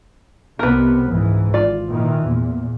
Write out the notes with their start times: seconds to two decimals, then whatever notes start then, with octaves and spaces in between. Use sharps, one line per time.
0.59 C2 C3 B3 A#4 B4
1.07 C#2 G#2 E3
1.54 G#1 F4 D5
1.87 A#2 D#3 E3
2.24 E2 A#2